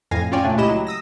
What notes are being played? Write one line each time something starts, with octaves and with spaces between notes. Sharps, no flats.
F2 A2 F5 G#5 A#6
C#4 F4 C#5 D5 G5 G#5
A#2 A3 D4
C#2 E4 G4 D#5 E7
F#3
D#6 E6 A#6